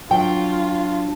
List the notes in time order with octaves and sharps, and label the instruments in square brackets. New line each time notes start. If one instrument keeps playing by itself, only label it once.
[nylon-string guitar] F#3 [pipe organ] D4 [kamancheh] F4 [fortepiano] G5